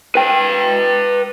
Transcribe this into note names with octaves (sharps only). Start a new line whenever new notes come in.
B4 G5